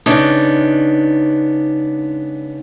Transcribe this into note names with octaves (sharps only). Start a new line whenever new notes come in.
C#3 G#3 B3 D4 D#4